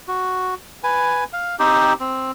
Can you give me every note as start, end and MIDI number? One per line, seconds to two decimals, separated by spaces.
0.08 0.55 66
0.83 1.24 71
0.83 1.24 80
1.33 1.56 77
1.59 1.93 60
1.59 1.93 63
1.59 1.93 67
1.59 1.93 72
2.00 2.31 60